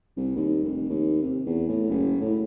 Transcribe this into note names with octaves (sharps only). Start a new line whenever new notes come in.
C2
D#2
F1
D#2
C3
E2
A2
F#1
A2